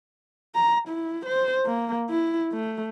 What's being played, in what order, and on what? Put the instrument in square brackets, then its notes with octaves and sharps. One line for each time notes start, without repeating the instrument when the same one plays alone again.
[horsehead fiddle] A#5
E4
C5
A#3
E4
A3